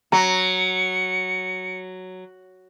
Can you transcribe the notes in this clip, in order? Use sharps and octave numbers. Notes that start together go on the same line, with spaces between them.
F#3 A#5 C#7